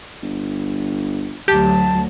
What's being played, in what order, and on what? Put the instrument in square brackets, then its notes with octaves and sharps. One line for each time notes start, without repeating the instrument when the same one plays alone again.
[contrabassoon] G1
[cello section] D2 F#3 [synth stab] G4 [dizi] A5